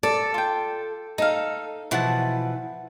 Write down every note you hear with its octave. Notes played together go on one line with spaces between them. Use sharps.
A4 D5
F4 G5
D#4 A4 F5
B2 E3 F3 E4 F#5 A5